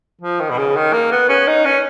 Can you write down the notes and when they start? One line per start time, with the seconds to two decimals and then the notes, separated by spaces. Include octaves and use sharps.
0.21 F3
0.40 D#3
0.50 B2
0.58 C#3
0.76 D#3
0.93 A#3
1.12 B3
1.29 C#4
1.48 D#4
1.65 C#4